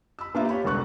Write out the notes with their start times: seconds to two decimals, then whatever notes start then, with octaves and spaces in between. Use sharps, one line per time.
0.19 B5 E6
0.35 A#3 D4 D#4 F4 G4 E5
0.49 G4 C#5 B5
0.64 E1 C2 A4 C#6 F#6